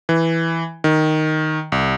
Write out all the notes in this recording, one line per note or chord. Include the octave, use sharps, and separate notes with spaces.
E3
D#3
C2